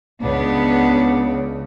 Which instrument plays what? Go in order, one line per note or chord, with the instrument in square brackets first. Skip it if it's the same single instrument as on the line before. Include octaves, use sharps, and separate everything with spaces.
[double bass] C#2 C#3 [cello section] B3 D4